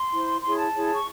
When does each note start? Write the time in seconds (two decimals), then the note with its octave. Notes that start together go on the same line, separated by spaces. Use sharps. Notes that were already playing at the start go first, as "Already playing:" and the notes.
Already playing: C6
0.11 E4 C5
0.43 E4 G#4 C#5 C6
0.57 A5
0.73 E4 G#4 C#5
0.92 C#6